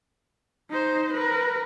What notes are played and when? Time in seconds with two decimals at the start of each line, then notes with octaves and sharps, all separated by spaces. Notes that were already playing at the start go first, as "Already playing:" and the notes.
0.70 D#4 C5
1.13 A#4 B4